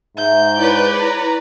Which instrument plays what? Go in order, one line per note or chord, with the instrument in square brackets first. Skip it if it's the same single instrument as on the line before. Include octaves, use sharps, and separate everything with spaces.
[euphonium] G#2 [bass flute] E5 [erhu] G6
[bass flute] E4 [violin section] B4 C#5 D5
[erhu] A#5